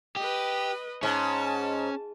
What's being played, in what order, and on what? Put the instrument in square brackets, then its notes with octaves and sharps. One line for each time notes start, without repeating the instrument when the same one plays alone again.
[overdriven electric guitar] G4 [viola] B4 D#5
[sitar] G#2 [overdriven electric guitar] C#4 [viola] A5